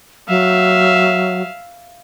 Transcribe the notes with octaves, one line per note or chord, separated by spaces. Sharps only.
F#3 E5 F5